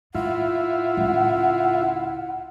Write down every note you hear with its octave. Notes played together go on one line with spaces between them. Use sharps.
A2 E4 F4 F#5
C#2 A2